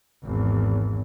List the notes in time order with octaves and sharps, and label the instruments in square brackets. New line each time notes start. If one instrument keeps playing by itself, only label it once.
[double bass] G#1 E2